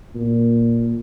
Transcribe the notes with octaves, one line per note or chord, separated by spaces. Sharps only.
A#2